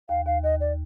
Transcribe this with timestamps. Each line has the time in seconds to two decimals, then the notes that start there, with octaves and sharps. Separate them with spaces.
0.09 D#2 F5
0.26 D#2 F5
0.43 D#2 D#5
0.60 D5